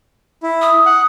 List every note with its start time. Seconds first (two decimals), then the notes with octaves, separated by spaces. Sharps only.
0.43 E4
0.61 D#6
0.86 F#5